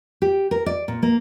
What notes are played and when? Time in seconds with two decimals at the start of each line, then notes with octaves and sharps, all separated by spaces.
0.22 G4
0.51 A#4
0.66 D5
0.88 A#2
1.03 A#3